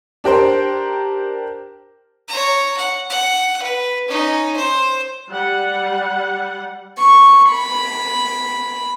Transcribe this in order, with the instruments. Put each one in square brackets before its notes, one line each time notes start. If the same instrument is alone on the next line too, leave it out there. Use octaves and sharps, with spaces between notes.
[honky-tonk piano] D4 G4 A#4 C5
[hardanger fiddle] C#5 A#5
F#5
F#5
B4
C#4 D#4
C5
[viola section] G3 F#5
[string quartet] C#6
B5